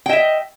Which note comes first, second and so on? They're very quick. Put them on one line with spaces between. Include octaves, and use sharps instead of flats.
G5 D#5 E5